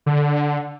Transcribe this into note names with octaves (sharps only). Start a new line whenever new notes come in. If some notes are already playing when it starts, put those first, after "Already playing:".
D3